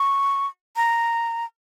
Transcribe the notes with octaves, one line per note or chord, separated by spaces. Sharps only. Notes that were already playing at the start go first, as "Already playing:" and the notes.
Already playing: C#6
A#5